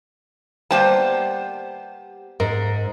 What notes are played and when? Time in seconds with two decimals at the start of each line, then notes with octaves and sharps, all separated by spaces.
0.71 G3 A#3 B3 G4 C5 A5
2.40 G#2 A#4